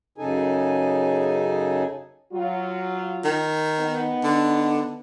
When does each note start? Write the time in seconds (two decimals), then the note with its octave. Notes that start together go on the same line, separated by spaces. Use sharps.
0.18 F#2 C#3 D#4 G#4 A4 G#5
2.33 F#3 F4
3.24 D#3
3.80 B3 D#4
4.24 D3